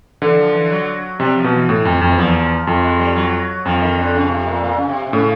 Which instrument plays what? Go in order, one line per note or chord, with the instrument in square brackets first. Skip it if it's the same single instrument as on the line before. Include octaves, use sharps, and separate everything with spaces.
[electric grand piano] D3 [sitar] E3
[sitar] F3
E3
F#3
[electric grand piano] C3 [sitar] G3
[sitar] F3
[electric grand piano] B2
[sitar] E3
[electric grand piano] A2
F2
F2
[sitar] E3
[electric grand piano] E2 [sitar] F3
[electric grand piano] F2
[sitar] G#3
G3
F#3
[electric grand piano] F2 [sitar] F3
[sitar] D#3
D3
C#3
C3
A#2
A#2
C#3
C3
C3
[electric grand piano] A2 [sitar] C#3